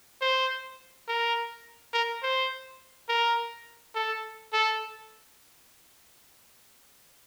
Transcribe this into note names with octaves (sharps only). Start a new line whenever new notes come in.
C5
A#4
A#4
C5
A#4
A4
A4